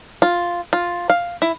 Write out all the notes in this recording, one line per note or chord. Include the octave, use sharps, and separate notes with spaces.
F4
F4
F5
E4